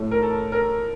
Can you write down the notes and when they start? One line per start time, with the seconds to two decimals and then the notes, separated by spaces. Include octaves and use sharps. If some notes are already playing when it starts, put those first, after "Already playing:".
Already playing: A2 A3
0.11 A#4
0.23 A4
0.52 A#4